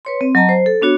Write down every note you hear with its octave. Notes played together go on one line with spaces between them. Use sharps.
B4 C#5 C6
C4
F#3 D#5 A5 A#5
C5
A4
B3 D4 F#4 C#5